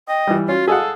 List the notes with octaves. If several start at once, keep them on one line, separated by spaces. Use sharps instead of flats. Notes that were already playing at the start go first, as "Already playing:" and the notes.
D#5 G5
E3 G3
C#4 F4 F#4
G#4 A4 F5 F#5